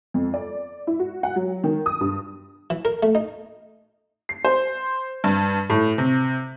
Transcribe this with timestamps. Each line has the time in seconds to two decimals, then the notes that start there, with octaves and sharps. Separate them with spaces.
0.14 F2
0.34 D5
0.87 E4
0.99 F#4
1.23 F#5
1.36 F#3
1.64 D#3
1.86 D#6
2.01 G2
2.70 E3
2.85 A#4
3.03 A3
3.15 D#4
4.29 C7
4.45 C5
5.24 G2
5.70 A2
5.98 C3